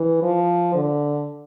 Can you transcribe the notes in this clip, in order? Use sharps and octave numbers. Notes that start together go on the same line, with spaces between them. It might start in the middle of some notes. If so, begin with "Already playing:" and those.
Already playing: E3
F3
D3